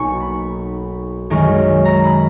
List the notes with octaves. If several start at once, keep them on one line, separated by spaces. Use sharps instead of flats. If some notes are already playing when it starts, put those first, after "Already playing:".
Already playing: B1 B2 A#3 D#4 G#5 C#6
B5
F#2 D#3 G#3 C#4
A#5
B5